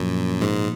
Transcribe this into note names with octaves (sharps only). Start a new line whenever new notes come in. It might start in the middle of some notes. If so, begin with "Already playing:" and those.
Already playing: F#2 A#2 F3 A#3
G#2